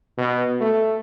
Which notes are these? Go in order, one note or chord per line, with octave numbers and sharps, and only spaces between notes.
B2
A3